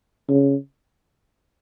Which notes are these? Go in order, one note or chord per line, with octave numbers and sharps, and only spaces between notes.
C#3